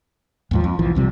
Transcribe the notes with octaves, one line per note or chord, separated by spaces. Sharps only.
D#2 G#2 F3
F2
B1 E3 F3
B1 C3 G3